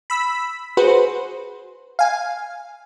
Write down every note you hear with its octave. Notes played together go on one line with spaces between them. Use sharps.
B5 E6 B6
F#4 G#4 B4 C5
F5 G#5